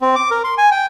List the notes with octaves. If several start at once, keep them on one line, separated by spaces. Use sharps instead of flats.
C4
D6
A#4
C6
G#5
G5